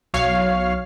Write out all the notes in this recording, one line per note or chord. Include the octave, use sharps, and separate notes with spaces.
B1 F#3 C#5 F5 F6 C7